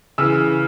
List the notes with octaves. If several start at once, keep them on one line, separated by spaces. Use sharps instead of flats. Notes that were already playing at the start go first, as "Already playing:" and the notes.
C#3 E3 E6